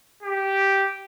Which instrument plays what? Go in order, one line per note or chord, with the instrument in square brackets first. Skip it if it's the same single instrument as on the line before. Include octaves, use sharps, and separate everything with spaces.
[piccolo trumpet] G4